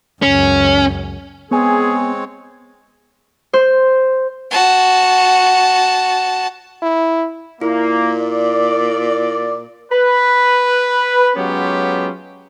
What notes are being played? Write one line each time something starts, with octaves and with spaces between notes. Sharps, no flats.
C#2 F#2 C#4
G#3 B3 C4 G#4 C#5 G#5
C5
F#4 A5
E4
A#2 A#3 E4
D5
B4
F#3 G#3 B3 C#4 F4 G4